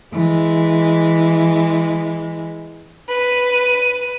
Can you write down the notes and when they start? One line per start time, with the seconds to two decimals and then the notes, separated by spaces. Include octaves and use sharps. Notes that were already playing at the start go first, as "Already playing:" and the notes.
0.13 E3 G#3
3.09 B4 D#7